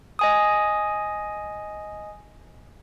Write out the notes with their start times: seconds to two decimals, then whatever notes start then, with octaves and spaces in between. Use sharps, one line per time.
0.19 D#5 G#5 D#6